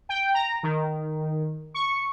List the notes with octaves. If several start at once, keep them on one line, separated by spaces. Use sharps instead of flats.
G5
A#5
D#3
C#6